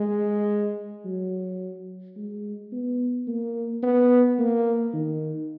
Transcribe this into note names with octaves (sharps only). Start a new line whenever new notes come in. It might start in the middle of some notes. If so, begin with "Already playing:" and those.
Already playing: G#3
F#3
G#3
B3
A#3
B3
A#3
D#3